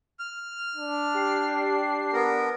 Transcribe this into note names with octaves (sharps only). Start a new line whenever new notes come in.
F6
D4
G4 C7
B3 A#4